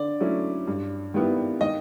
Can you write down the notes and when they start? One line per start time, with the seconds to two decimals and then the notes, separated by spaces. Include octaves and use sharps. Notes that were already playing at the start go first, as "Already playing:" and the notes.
Already playing: D3 D5
0.20 F#3 A3 C#4 E4
0.67 G2
1.14 D#3 G3 B3 E4
1.61 D#3 D#5